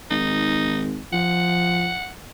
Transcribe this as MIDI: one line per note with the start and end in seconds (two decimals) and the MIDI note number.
0.10 0.99 32
0.10 0.83 63
1.13 1.93 53
1.13 2.09 78